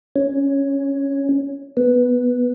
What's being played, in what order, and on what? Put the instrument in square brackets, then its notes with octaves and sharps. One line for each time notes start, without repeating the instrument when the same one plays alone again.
[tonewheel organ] C#4
B3